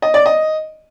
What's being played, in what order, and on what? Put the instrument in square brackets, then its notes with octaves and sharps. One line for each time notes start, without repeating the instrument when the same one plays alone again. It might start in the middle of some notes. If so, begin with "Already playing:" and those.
[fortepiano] D#5
D5
D#5